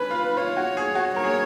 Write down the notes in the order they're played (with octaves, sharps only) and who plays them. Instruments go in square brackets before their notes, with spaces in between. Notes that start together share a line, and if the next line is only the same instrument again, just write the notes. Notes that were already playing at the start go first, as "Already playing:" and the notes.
Already playing: [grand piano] C#4 [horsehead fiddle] B4
[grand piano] F4
[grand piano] F4 [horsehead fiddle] C#5
[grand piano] F#4
G#4
F#4
[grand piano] A#4 [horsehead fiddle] C#5
[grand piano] G#4